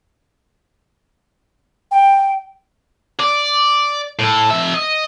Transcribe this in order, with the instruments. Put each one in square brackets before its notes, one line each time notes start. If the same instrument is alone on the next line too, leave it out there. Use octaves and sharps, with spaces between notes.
[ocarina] G5
[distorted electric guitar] D5
A2 A4
F2 E5
D#5